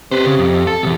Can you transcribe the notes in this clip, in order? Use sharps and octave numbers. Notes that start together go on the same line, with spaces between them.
C3 B4 C5
C#3
F2
A4
B1 E2 C3